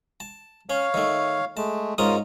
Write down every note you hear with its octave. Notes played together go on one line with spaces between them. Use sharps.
A5
C#4 C#5 F5
D#3 A3
G#3 A3 A5
G#2 C#4 F4 A#4 D#6